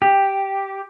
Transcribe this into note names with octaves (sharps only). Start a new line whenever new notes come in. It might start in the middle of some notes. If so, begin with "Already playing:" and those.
G4